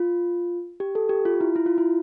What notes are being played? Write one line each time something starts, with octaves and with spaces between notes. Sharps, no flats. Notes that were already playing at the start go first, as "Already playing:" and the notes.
Already playing: F4
G4
A4
G4
F4
E4
E4
F4
E4